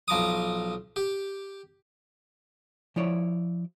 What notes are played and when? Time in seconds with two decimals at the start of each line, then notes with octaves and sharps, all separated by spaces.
0.08 B1 F3 A#5 D6 D#6
0.96 G4
2.96 F3 E4 C#5 D5